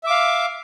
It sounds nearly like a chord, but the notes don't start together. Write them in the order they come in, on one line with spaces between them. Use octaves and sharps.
E5 D6 F5